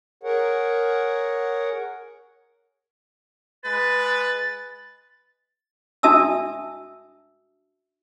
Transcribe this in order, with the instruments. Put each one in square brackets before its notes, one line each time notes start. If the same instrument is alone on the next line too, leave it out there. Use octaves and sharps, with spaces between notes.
[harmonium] G#4 A#4 C#5 F#5
[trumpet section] G#3 B4 [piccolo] A6
[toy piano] D4 F#4 E5 A5 D#6 E6